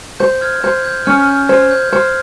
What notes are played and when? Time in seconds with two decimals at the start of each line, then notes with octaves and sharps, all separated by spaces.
0.20 C5 G6
0.41 F6 G#6
0.64 C5 G6
0.84 G6
1.06 C#4 F6
1.27 G6
1.49 C5 F6 G#6
1.71 G6
1.81 G6
1.92 C5 F6 G#6